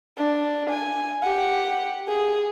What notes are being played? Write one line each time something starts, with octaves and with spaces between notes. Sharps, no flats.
D4
G#5
G4 F#5
G#4